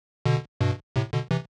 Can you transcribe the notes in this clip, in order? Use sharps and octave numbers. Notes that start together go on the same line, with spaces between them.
B2 D3
G2 B2
A2 C3
B2 D3
C3 E3